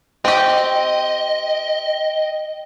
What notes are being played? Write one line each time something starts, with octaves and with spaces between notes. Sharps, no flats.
C4 G4 D#5 G5